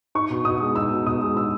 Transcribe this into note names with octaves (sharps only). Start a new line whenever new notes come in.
D#4 C#6
B2
B2 D#6
G#3
D#4 E6
B2
B2 D#6
G#3
D#4 E6